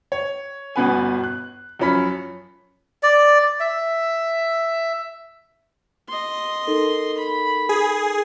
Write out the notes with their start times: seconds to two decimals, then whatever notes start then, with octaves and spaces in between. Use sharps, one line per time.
0.12 C#5
0.76 G1 B2 B3 B4 G#5
1.24 F#6
1.79 F#2 F3 C#4 B5 B6
3.03 D5
3.60 E5
6.08 D#5 C6
6.67 D#4 A4 A#4
7.17 B5
7.69 G#4